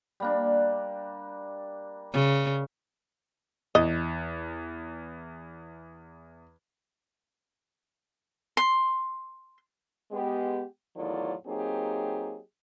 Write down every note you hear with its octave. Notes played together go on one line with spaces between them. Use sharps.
G3 A#3 D4
C#3
E2 D#5
C6
G#3 B3 G4
E2 A2 D#3 F#3 F4 D5
F#3 A#3 C4 D#4 G4 G#4